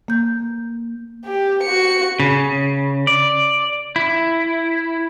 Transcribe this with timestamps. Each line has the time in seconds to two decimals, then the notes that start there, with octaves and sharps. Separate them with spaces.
0.08 A#3 G6
1.25 G4
1.63 F#4 C#7
2.20 C#3
3.07 D5
3.96 E4